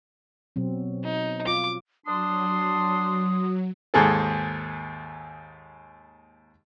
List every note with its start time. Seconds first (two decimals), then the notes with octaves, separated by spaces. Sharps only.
0.56 B2 F#3 C4
1.04 D#4
1.47 F4 D6
2.07 F#3 D4 C6 D#6
3.94 D#2 G#2 G#4 A4